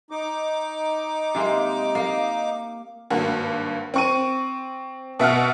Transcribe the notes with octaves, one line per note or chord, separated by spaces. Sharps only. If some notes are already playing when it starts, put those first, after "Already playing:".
D#4 D6
C3 G#3 A#3
A#3
G#1 G2 A#3 F#4
C4 C#6 D#7
B2 E5 F#5 F6